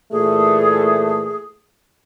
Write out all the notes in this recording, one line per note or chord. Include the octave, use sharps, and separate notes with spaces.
A#2 E3 A3 G#4